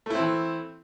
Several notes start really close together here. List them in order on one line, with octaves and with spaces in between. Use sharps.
A3 E4 C4 E3